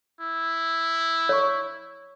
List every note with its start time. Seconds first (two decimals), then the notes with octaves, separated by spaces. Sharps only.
0.20 E4
1.29 C#5 C#6